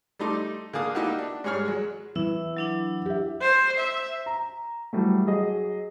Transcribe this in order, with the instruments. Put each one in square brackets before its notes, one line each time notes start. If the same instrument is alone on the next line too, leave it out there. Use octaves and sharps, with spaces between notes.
[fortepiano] G3 A3 D#4 C6 D6
D3 A#3 G#4 F5 D#6
A#3 D#4 E4 F#4 G4
D4
G#2 G3 G#4 C#5 F6
F#3 G#3
[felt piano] E3 [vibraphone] E4 E5
[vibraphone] F#3 D4 E4
[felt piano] G4 E5
[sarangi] C5
E5
[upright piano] A#5
E3 F#3 G3 A3
F#3 G#4 D#5